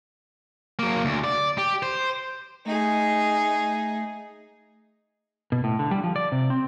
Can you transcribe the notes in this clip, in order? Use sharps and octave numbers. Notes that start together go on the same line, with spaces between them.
F#3 A#3
D2
D5
G4
C5
A3 D#4 G#4
B2
A2
D3
G3
F3
D5
C3
C4